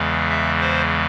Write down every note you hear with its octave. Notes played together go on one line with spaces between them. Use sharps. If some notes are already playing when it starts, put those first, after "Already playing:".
Already playing: E2 C#3 E3 G#3
E5
C5